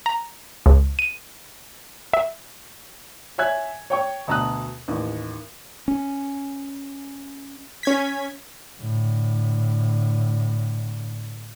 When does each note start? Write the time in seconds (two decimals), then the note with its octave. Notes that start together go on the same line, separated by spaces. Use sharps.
0.06 A#5
0.66 C#2
0.99 D#7
2.13 E5
3.38 C#5 E5 G#5 F#6 G#6
3.90 C#5 G5 C#6
4.28 D2 B2 A5 A#5 D#6 F#6
4.88 A1 D#2
5.88 C#4
7.83 C#4 G#6 B6
8.79 A2 D3